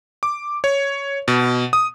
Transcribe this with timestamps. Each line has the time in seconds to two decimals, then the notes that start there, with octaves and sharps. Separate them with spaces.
0.23 D6
0.64 C#5
1.28 B2
1.73 D#6